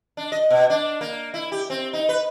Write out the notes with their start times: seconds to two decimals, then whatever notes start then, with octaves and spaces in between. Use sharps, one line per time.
0.17 D4
0.32 D#5
0.50 B2
0.70 D4
1.01 A#3
1.34 E4
1.52 G4
1.70 C4
1.93 D#4
2.09 B4